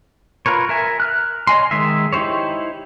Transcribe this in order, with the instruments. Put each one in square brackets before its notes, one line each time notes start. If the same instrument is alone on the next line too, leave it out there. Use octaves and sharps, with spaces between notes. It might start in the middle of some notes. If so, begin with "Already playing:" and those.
[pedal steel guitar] F4 A#4 B4 C#5
A#4 E5 G#5
F6 F#6
C#5 D#5 G#5 C6
D#3 G#3 G#4 E5
D#4 E4 G4 C5 C#5